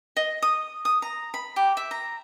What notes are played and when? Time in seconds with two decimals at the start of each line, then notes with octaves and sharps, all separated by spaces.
0.17 D#5
0.42 D#6
0.85 D#6
1.02 A#5
1.34 B5
1.56 G4
1.77 E5
1.91 A#5